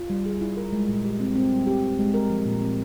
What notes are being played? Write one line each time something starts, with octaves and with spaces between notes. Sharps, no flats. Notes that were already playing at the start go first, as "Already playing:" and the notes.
Already playing: F4
G3
G#4
E4
A#4
G#3
A#2
G4
C4
C4
G3
G4
G4
G#3
A#4
F3
A#2
C4